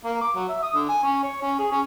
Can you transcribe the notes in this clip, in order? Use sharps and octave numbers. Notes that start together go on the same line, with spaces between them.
A#3
D6
F#3
E5
D#6
D3
G#5
C#4
C#5
C#4
G#4
C#4